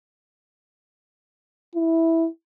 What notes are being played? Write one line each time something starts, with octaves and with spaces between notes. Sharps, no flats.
E4